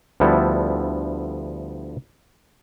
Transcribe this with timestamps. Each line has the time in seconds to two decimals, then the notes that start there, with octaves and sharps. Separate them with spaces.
0.20 D2 F3 G3 B3 E4 A4